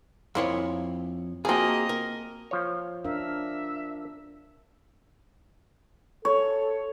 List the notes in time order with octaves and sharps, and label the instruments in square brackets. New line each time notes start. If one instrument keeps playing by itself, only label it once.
[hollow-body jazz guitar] F2 E4 C#5 [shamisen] A#3 C5
[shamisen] F3 C4 [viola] A#3 D#5 [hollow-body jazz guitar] F#4 G#4
[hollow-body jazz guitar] A#4
[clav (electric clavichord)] F3 C#5
[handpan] D4 A#4 F5 [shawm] E5
[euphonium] A4 [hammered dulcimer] C#5